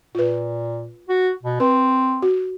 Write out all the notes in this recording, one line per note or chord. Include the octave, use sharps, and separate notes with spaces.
A#2 F4 B4
F#4
B2
C4 B4
F#4